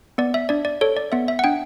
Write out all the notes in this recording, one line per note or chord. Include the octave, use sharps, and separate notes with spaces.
B3 D5
E5
D4 D5
D5
A4 C#5
D5
B3 E5
E5
F#5
D4 G5